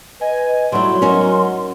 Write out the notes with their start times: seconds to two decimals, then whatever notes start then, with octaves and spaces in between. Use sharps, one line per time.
0.21 B4 D#5 G#5
0.72 A2 F#3 G3 E4 C6
1.02 C#4 D#4 F#4 A#4